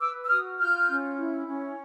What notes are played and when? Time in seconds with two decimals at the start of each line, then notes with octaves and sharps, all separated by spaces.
0.01 B4 D6 E6
0.25 E6
0.29 F#4 D#6 F6
0.59 F4 F6 G6
0.89 C#4
1.18 E4
1.47 C#4